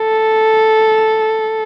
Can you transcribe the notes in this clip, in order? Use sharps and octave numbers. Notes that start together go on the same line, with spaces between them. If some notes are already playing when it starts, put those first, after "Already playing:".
Already playing: A4